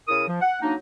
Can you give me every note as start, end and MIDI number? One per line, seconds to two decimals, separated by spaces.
0.08 0.26 49
0.08 0.26 64
0.08 0.26 70
0.08 0.26 87
0.28 0.40 53
0.41 0.57 78
0.62 0.74 54
0.62 0.74 58
0.62 0.74 62
0.62 0.74 63